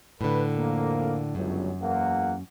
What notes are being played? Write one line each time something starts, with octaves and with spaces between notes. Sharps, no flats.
A2 D3 B4
F2 A#3
G1 C#2 F#2 F#3
E2 A#3 F#5